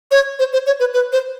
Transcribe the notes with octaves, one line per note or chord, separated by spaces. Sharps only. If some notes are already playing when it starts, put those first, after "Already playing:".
C#5
C5
C5
C#5
B4
B4
C5